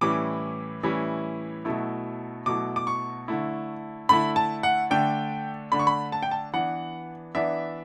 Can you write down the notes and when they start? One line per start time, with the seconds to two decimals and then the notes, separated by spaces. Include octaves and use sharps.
0.01 A2 E3 G3 C#4 E4 D6
0.83 A2 E3 G3 C#4 E4
1.65 B2 F#3 A3 E4
2.46 B2 F#3 A3 E4 D6
2.76 D6
2.87 C#6
3.28 D3 A3 E4
4.09 D3 A3 E4 B5
4.36 A5
4.63 F#5
4.90 D3 A3 D4 G5
5.72 D3 A3 D4 B5
5.79 C#6
5.87 B5
6.12 A5
6.23 G5
6.31 A5
6.54 E3 B3 D4 F#5
7.35 E3 B3 D4 E5